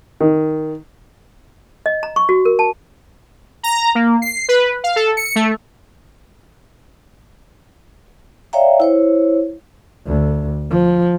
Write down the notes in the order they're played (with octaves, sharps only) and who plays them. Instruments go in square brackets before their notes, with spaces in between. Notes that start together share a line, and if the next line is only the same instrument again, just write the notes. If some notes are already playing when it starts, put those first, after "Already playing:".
[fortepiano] D#3
[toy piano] D#5
A#5
C#6
F#4
A#4
A5
[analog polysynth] A#5
A#3
C7
B4
F5
A4
C#7
A3
[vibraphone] C#5 D5 E5 F5 G5 A#5
E4 C5 C#5
[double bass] D2
F3